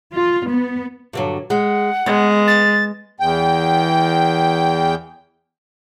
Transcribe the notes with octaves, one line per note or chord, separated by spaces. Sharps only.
F4
B3
G2 D3 F#3
G#3 F#5
G#3 B3
A6
E2 G5